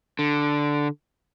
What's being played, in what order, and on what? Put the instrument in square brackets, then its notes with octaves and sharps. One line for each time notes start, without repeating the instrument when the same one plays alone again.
[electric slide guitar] D3